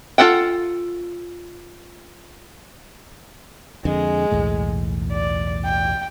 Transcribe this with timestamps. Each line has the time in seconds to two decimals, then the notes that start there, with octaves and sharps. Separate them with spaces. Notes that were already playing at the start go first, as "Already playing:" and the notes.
0.18 F4 F#4 A4 F#5 G5
3.85 F2 D3 G#3
4.32 B1 E2 A2
5.12 D5
5.65 G5